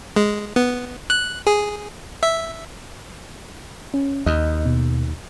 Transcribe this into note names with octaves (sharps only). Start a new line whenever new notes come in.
G#3
B3
F#6
G#4
E5
C#4
D#2 D#5
B2